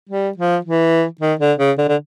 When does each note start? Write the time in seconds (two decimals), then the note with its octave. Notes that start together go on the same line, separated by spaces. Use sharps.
0.09 G3
0.37 F3
0.65 E3
1.21 D#3
1.40 D3
1.59 C#3
1.78 D3
1.88 D3